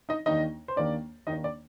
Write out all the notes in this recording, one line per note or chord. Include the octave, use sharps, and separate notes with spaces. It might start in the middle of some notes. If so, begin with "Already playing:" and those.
D#4 D#5
D#2 D#3 A#3 D4 D#4 D#5
C5
D#2 D#3 A#3 D4 D5
D#2 D#3 A#3 D4 D#4 D#5
D5